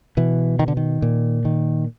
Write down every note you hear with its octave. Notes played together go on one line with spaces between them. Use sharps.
B2 E3
D#3
D3
D#3
A#2
D#3